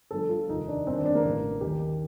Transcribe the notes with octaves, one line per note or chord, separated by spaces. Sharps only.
G1 G2 F3 A4
F4
F1 D#2 D#3 D#4
D4
G1 G2 D#3 C4
D4
D4
A#3
A1 G2 D3
D#2 D#3 G4